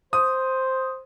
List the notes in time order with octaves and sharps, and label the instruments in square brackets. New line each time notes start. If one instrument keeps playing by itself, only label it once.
[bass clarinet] C5 [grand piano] D#6